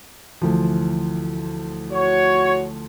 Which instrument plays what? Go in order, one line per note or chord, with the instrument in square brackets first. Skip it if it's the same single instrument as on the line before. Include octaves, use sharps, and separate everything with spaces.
[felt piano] D2 E3 F3
[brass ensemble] F#4 C#5